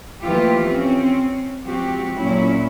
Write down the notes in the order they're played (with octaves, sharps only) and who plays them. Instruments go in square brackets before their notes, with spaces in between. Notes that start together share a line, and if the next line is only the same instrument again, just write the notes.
[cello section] E3 F3 A3 A#3 F4 G4
C4 C#4
F3 G#3 C4 F#4 G4
A#2 F#3 A#3 C#4 E4